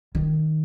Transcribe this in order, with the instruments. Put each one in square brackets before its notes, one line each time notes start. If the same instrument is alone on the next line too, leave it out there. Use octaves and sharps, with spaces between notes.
[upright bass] D#3